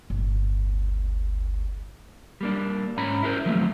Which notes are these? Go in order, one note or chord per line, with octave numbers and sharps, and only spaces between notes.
D1 G1
G3 A#3 D4
G#2 C#4 A#5 B5
E4 G#4 A#4 C5
D#3 F3 F#3 A3 A#3 C4